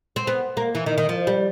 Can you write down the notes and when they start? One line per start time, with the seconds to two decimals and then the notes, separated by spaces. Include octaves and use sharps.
0.16 C4
0.27 B3
0.57 A#3
0.75 E3
0.86 D#3
0.98 D#3
1.09 F3
1.27 G3